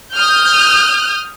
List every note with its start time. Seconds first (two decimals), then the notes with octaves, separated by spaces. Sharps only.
0.13 D#6 F6 G6